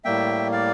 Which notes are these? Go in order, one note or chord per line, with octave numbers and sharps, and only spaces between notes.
A2 G3 A#3 E5 G5
D5 F5